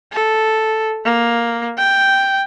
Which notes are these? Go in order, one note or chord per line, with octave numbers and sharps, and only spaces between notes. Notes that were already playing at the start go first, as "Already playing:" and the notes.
A4
A#3
G5